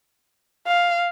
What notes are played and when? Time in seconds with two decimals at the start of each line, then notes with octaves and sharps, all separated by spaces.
0.67 F5